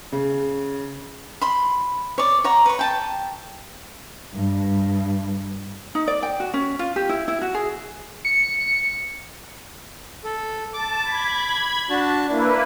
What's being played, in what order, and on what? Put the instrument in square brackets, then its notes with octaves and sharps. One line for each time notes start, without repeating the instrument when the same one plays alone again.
[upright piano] C#3
[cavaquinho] B5 C6
C#5 D5
C#5 F#5 A#5
B4 C#5
G5 A5
[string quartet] G2
[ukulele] D#4
D5
G5
F#4
C#4
F4
G4
E4
E4
F#4
G#4
[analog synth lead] C#7
[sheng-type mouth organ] A4
[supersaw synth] A5 [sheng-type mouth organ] D6
[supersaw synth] B5 G#6
[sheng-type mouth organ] D4 F#4 A5
[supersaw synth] A#3 E4 B4 [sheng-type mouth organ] D4